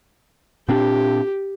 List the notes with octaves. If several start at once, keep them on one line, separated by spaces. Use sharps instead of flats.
A#2 C4 D4 G4